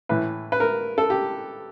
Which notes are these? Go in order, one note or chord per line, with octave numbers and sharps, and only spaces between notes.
A2 E3 B4
B4
A#4
A4
G4